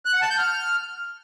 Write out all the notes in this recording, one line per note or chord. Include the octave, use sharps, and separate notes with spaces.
F#6
F#5
A5
G6
F6